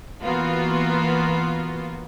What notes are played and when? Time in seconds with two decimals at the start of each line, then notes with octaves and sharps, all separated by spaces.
0.24 E3 A#3 B3 F4 F#4